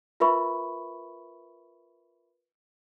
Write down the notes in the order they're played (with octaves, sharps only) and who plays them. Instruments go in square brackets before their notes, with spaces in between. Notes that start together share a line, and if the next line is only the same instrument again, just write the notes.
[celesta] F4 A#4 B4 E5 B5 C#6